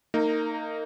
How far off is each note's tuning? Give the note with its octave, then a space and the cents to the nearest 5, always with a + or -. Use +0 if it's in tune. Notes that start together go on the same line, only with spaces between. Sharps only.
A#3 -25 D#4 +0